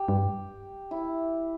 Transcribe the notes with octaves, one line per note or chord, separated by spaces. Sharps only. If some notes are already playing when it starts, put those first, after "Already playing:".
Already playing: G4
G2
E4